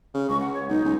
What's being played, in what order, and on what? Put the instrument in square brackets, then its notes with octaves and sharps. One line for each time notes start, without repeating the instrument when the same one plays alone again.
[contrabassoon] C#3
[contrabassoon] C#2 [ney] C#6
[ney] F#5
C#5
[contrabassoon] B1 [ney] D#4
[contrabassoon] C#2